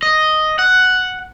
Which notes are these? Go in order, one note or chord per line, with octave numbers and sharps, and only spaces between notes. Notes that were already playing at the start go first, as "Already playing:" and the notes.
D#5
F#5